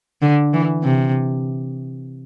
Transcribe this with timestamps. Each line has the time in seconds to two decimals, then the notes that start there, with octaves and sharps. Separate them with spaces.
0.22 D3
0.53 E3
0.83 C3